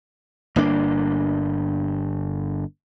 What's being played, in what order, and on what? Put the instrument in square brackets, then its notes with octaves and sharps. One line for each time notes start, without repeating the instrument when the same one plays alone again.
[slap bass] G1 A#3 D4